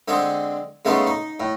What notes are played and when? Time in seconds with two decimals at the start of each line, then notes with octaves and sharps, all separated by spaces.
0.08 D3 G#3 C4 G#4
0.85 C#3 G#3 A3 B3 D#4 F4
1.07 D#4
1.40 A2